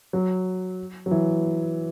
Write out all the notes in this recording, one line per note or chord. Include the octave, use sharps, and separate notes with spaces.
F#3
F#3
E3